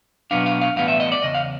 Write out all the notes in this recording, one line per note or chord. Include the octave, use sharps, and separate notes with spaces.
B2 F#3 B3 D4 F5
F5
F5
A2 E3 G3 B3 F5
E5
D#5
D5
E2 C#3 D#5
F5